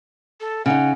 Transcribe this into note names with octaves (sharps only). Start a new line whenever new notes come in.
A4
C#3 D#4 F#5